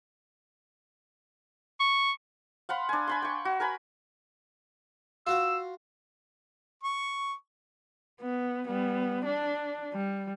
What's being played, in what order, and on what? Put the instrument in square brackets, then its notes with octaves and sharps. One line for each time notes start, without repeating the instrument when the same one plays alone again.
[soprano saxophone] C#6
[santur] F5 F#5 B5 C6
D4 G#5
G#5 B5 C6
G5 C#6
F#4
A#4 G#5 B5
[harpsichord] F4 F#4 F5 [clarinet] E6
[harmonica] C#6
[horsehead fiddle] B3
G3 B3
D4
G3